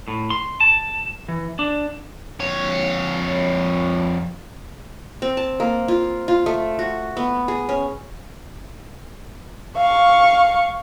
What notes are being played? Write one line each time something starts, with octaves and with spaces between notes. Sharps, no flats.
A2
C6
A5
E3
D4
F2 C#5
C4
A5
A#3
F4
F4
A3
F#4
B3
G#4
C#4
F5 C#6